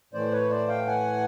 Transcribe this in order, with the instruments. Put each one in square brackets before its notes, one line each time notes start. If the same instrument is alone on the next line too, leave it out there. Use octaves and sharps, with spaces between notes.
[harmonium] A2 E3 A3 C5 D5
B4 C#5
C5 D5
F5 G5
F#5 G#5